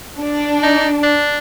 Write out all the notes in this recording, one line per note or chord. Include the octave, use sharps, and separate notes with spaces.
D4
D#4
D4